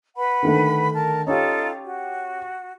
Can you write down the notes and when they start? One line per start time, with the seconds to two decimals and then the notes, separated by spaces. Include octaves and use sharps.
0.17 B4 F#5 B5
0.43 D3 D#3 A3
0.95 A#4 A5
1.27 C#4 D#4 F4 G4 A4
1.84 F#4